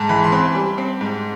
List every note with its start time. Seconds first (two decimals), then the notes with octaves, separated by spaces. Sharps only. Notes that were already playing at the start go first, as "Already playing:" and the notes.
Already playing: G#2 A5
0.09 E3 B5
0.24 C6
0.32 C4 B5
0.55 G3
0.78 C4
1.01 G#2